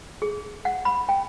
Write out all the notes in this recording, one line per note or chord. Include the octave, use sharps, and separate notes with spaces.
G#4
F#5
B5
G5